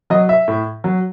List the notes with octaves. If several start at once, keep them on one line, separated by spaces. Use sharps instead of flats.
F#3 D#5
E5
A2
F#3